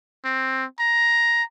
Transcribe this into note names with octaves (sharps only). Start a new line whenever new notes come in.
C4
A#5